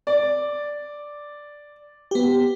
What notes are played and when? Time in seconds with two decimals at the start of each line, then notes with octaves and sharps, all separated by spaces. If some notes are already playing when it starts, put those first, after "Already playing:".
0.07 D5
2.11 B3 G4